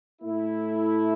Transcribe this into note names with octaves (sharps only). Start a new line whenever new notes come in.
A2 A3 E4